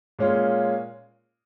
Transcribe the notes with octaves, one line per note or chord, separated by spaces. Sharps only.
A#2 G#3 C#4 F4